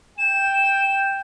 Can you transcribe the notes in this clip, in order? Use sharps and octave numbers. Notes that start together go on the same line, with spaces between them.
G5 E7